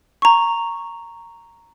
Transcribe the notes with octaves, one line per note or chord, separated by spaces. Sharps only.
A#5 C#6